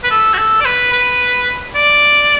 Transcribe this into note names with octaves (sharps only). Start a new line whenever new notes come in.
B4
A4
F#4
A4
D5
B4
B4
D5